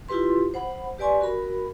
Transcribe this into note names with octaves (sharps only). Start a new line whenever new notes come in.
E4 F4 G4 B4 C6
C5 F#5 B5
G4 B4 D5 G#5 C6 C#6
F#4 A#4 B5